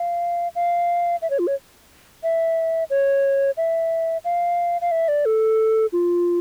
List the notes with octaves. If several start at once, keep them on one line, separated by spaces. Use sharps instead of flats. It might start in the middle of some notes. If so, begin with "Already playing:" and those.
Already playing: F5
F5
E5
C#5
F4
C#5
E5
C#5
E5
F5
F5
E5
D5
A4
F4